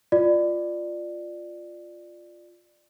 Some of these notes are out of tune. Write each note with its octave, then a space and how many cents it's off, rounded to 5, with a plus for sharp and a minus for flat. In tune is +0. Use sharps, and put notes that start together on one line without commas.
F4 +0 D5 +20